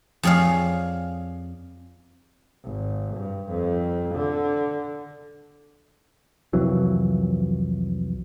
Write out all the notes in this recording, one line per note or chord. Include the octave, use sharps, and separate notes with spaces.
F2 G#4 C#5 D5 F5
G#1
G2
F2
D3
C2 F2 E3 F#3